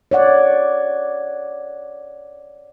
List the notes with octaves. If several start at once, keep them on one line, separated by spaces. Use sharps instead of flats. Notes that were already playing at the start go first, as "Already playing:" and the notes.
C#5 D5 F#5